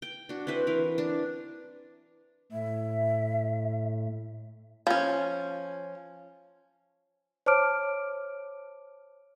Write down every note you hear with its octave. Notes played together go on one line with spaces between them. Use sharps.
G5
D4 F#4
C4 E4 B4 C5
E3 A#4
D4
A2 E5
F3 C#4
C5 C#5 A5 D6 F6 D7